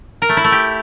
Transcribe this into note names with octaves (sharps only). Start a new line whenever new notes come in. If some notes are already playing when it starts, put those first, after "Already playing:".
A#4
A3
E4
A3
G4